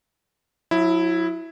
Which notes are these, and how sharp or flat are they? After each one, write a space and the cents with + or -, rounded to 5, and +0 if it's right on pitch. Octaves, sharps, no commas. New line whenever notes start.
F#3 -35 E4 +0